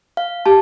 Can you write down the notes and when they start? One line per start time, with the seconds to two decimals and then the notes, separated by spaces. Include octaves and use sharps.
0.17 F5
0.46 G4 A5